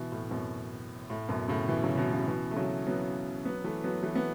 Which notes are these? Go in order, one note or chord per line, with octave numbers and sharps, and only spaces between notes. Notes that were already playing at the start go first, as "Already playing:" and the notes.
Already playing: B2 E3
A2
F#2 B2
A2
F#2 B2
A2 C#3
B2 E3
C#3 F#3
B2 E3
C#3 F#3
B2 E3
A3
C#3 F#3
F#3 B3
F#3 B3
E3 A3
F#3 B3
E3 A3
B3